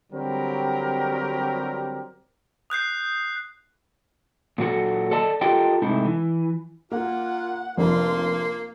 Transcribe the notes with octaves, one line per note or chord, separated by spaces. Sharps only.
D3 F#3 G3 C4 G4 A#4
D#6 F#6 G6 C7
A#2 F#3 F#4 A4
A4 D5 D#5 A5
F4 G4 A4 A#4 D#5 G5
G#2 C3 A3 D#4 E4
E3
A#3 F4 F#5
F1 F2 A#3 D4 F4 C6